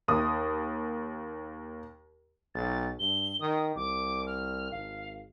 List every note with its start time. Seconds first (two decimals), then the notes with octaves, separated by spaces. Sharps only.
0.08 D#2 D#6
2.55 B1 A6
2.99 G2 G7
3.41 D#3 D#6
3.76 C2 D6
4.26 F6
4.72 G#1 F5